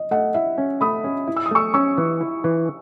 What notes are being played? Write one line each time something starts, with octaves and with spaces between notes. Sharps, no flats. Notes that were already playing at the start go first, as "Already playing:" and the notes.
Already playing: D#5
A3 D#5 F#5
E4 E5
C#4
A3 B5 D#6
C#4
E4
E6
D#6
A3 C#6 E6
C#4 C#6 E6
E3
E4
E3